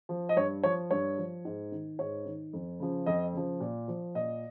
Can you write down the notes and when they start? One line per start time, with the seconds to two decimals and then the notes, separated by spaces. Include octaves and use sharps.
0.09 F3
0.29 D#5
0.36 G2 C#5
0.63 F3 C#5
0.91 G2 C#5
1.18 F3
1.45 G#2
1.72 D#3
1.99 G#2 C#5
2.26 D#3
2.53 F2
2.80 C#3 F3
3.06 F2 D#5
3.33 C#3 F3
3.60 A#2
3.88 F3
4.15 A#2 D#5